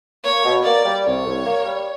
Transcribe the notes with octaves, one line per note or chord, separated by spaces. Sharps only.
A#3 C#5
B2
A#3 D5
G3
C2 C#5
C2
A#3
G3